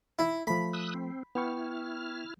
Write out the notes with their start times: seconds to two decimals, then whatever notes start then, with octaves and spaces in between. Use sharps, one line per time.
0.19 E4
0.47 F3 A3 B5
0.73 D#6 E6 F#6
0.94 C4
1.35 B3 E4 G5 C#6 F6